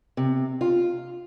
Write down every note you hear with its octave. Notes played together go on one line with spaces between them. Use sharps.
C3
F4